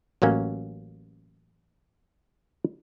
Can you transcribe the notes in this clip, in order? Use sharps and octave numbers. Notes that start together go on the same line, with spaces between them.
A1 F#3 A#3 C#4